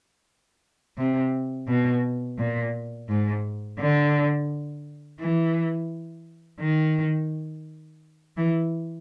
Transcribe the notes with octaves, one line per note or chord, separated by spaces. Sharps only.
C3
B2
A#2
G#2
D3
E3
D#3
E3